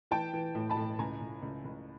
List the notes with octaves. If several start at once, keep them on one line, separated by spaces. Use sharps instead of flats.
E3 G5 A5
E3
A2
A5 B5
A2
C#2 G#5 A#5
C#2
C#2
C#2